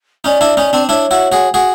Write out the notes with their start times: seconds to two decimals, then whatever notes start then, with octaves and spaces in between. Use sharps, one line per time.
0.24 C#4 D#4 D5
0.41 D4 E4
0.57 C#4 D#4
0.73 C4 D4
0.89 D4 E4 C#5
1.11 E4 F#4
1.32 F#4 G#4
1.54 F#4 G#4